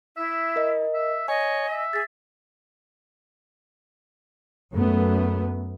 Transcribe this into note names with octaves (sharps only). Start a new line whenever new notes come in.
E4 E5
A#4 D#5
E5
C#5 D#5 G#5
E5
G#4 A6 B6
F#2 A3 B3